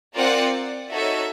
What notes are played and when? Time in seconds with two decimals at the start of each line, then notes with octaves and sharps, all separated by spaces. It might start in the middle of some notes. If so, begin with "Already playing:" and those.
0.16 C4 F4 A#4 D5 F#5
0.92 D#4 F#4 A4 C#5 E5